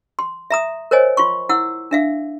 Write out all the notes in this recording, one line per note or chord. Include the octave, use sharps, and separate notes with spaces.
C6
E5 A#5 D#6
A#4 C5 C#5 D#5 G#5
F4 C6 C#6
E4 F#5 E6
D4 E5 F5